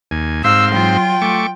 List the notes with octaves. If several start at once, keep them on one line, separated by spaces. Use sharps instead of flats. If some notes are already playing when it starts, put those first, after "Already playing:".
D#2 G#5
G#2 C4 F5 C6 E6
F#3 F4 G5
A3 C#6 D6